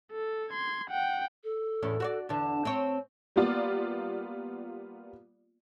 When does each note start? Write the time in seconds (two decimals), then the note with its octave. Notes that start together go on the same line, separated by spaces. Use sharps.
0.12 A4
0.50 C6 G#6
0.90 F#5 G5
1.44 A4
1.83 E2 A2 C#4
2.00 F#4 C#5 D5
2.29 E2 D3 A5
2.65 C4 C#5
3.36 G3 A#3 B3 F4 D5